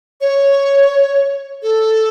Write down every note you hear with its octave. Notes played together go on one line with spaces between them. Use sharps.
C#5
A4